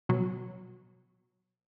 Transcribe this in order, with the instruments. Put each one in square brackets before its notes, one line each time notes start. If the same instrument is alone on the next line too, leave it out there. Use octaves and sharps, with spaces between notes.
[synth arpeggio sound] B2 F#3